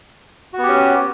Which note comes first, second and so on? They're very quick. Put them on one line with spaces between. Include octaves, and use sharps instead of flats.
F#4 B3 G4 C#4